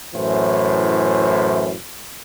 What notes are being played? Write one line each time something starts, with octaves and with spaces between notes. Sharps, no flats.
F#2 A2 E3 C5